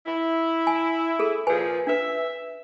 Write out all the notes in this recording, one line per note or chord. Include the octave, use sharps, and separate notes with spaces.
E4
G#5
G#4 A4
A#2 F3 G#4 B4 G#5
D4 B4 E5